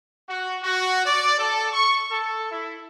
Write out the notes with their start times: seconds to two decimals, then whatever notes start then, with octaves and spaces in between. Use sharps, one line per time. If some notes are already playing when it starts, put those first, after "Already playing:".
0.29 F#4
0.62 F#4
1.05 D5
1.38 A4
1.72 C#6
2.11 A4
2.51 E4